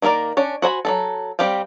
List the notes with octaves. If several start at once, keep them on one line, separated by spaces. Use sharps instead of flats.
D#3 A#3 B3 A#4 D5
C#4 D4 C#5
F#4 C5 G#5 B5
F#3 G#3 A4
G3 C4 G4 F5 G5